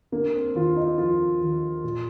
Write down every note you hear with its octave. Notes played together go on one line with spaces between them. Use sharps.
D3 A#3
C4
D#2 F4
D#4
F3 F4
D#2
A#2